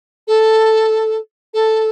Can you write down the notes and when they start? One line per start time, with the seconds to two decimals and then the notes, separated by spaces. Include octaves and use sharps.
0.27 A4
1.54 A4